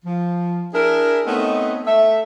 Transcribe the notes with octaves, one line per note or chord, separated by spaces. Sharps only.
F3
D4 E4 G#4 A#4
A3 B3 C4 D#4 C#5 D#5
A3 E5